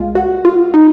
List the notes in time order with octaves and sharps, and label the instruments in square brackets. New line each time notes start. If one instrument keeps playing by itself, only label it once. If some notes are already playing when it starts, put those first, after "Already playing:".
Already playing: [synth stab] C2 A#2 G#3 F4
F#4
F4
D#4